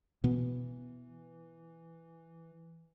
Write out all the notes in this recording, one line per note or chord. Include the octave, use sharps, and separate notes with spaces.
B2 E3 B3